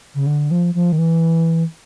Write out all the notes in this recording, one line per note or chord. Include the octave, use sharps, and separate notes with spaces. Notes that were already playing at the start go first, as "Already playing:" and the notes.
C#3
D3
F3
F3
D#3
E3